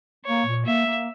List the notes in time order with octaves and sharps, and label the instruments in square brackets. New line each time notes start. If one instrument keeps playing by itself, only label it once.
[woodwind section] A#3 [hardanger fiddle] C#5
[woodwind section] A#2
[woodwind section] A#3 [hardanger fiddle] E5
[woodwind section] A#3